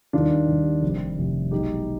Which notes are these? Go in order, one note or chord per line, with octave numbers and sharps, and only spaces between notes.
D#2 D#3 G3 D4 F4
D#2 D#3 G3
F1 F2 C3 G3
F1 F2 C3 G3
B1 B2 G#3 D#4 G4